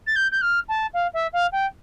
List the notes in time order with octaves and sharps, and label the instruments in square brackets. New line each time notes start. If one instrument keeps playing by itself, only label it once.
[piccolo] A6
G6
G6
F6
A5
F5
E5
F5
G5